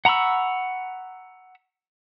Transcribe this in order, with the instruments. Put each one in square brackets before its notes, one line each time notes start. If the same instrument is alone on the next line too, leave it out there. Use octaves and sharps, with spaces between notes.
[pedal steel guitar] F#5 A#5 B5 C#6 E6